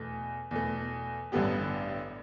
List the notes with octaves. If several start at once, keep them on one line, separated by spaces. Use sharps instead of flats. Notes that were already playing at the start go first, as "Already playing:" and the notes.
Already playing: E2 B2 A3
E2 B2 A3
A1 G2 D3 B3 G4